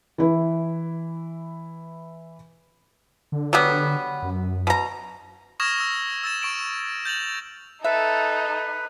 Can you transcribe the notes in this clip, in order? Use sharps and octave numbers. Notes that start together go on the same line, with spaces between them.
E3 E4 B4
D3
F#3 G3 B3
F#2
B2 A#5
C#6 D#6 F6 G#6 A#6 E7
E6
E6 A6 E7
C#6 D7 E7
G6 A6 F7 F#7
D#4 A4 B4 E5